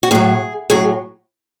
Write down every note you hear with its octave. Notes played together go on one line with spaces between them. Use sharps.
F#4
A2 F#3 G#4
A2 F#3 G#4